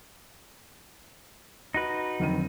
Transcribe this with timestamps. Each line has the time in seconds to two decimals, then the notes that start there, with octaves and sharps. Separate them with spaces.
1.74 D#4 F#4 B4
2.20 F1 D3 D#3 F#3 C4 D#7